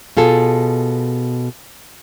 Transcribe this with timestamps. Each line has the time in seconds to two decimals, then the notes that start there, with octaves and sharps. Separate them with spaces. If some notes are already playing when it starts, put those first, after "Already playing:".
0.17 B2 F4 G#4 A4